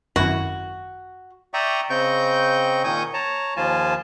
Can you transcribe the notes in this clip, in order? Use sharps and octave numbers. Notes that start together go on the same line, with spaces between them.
G#1 F#2 E4 F#4
D5 E5 G5 A#5 C#6 D#6
C#3 C4 D#5 G5 C#6 G6
A#2 D#3 G#5 C#6 D#6 G6
C#5 A5 A#5
D#2 F3 F4 G#5 A5